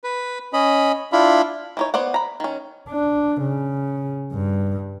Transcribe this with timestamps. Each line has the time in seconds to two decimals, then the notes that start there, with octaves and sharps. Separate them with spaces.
0.04 B4
0.53 C#4 D#5 B5
1.13 D4 E4 F4 B5
1.77 E3 D#4 C#5
1.94 B3 C5 D5 F#5
2.14 A#5 B5
2.40 D#3 C#4
2.90 D4
3.41 C#3
4.34 G2